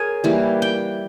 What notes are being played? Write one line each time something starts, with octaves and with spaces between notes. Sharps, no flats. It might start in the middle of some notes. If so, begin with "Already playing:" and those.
Already playing: G#4 A#4 C#5 G#5
E3 G3 A#3
G5